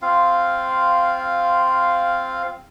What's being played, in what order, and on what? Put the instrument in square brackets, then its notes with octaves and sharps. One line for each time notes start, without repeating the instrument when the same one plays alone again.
[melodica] C4 F4 F5